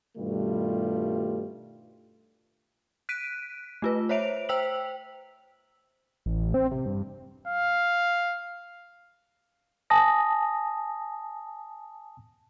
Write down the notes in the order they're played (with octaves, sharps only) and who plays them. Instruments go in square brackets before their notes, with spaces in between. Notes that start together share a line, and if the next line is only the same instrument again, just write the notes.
[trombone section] G2 B2 D#3 G3 A3 F4
[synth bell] F#6 B6 D7 D#7
A3 F4 B4
C5 C#5 E5 D7 F7
C5 G5 E6 B6 F7 F#7
[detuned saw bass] A1
C4
C3
G2
[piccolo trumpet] F5
[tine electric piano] G#5 A5 D#6 A#6